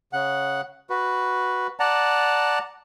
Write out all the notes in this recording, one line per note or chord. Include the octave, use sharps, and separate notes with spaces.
C#3 F#5
F#4 B4
D5 F#5 A5 A#5